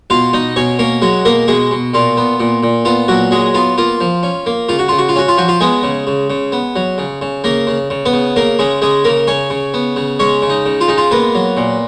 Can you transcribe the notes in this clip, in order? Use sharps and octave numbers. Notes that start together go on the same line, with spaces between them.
B2 F4 F5
B2 D#4 D#5
B2 C#4 C#5
A#3 C#4 A#4
F#3 G#3 F#4
B2 A#3 A#4
B2 G#3 G#4
B2
A#2 F4
B3
A#2
A#2
B3 F4
A#2 F#3 F#4
F#3 G#3 G#4
B3 F4
A#3 F4
F3
C#4
A#3
C#3 F4
F#4
C#3 F4
F#4
F4
C#4 F#4
F4
F3 F#4
F4
G#3 B3 G#4
C#3
C#3
C#3
B3
F#3
C#3
C#3
C#3 A#3 A#4
C#3
C#3
B3 B4
C#3
C#3 A#3 A#4
C#3 G#3 G#4
C#3 G#3 G#4
C#3 A#3 A#4
C#3 C#4 C#5
C#3
B3
C#3
G#3 C#4 C#5
C#3
D#4
C#3
F4
G#3 D#4
F4
A#3 B3 B4
F#3
A#2